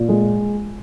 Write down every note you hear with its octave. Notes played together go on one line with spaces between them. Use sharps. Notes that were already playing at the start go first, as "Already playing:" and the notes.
Already playing: A#2
G#3